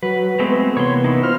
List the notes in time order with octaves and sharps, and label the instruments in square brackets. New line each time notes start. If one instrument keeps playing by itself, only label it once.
[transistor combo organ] F#3 [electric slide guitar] B4
[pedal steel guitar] G#3 A3 C4 [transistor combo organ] B3
[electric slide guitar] C3 E3 A#3 [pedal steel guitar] C#5 C6
[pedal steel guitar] D#4 E4
[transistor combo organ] F4 C5 F6